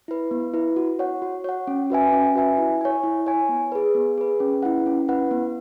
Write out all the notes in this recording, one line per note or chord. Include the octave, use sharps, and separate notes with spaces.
E4 B4
B3
E4 B4
F#4
C#5 F#5
F#4
C#5 F#5
C#4
F#4 B4 E5 G#5
C#4
F#4 B4 E5 G#5
E4
C#5 G#5
E4
C#5 G#5
B3
G#4 B4
B3
G#4 B4
C#4
E4 B4 F#5
C#4
E4 B4 F#5
B3